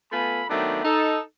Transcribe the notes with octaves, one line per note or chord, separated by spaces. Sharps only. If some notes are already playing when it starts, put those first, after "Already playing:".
A3 B3 F4 A4 G#5 B5
D#3 F#3 A3 B3 C4 D4
D#4 A4